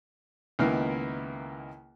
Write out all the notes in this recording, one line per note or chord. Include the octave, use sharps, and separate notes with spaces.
C#2 D#3 A#3 B3 E4